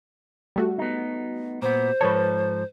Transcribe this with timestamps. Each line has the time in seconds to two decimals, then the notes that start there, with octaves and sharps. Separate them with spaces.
0.56 G3 A3 F#4
0.78 B3 D#4
1.62 A#2 B3 C5
2.01 G#2 F3 A4 B4 C#5